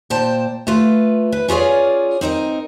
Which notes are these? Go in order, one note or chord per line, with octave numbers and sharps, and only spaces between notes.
A#2 C5 G5 A5
A3 F4 B4
B4
C#4 F4 G#4 C#5 D5
C4 D#4 A#4 D#5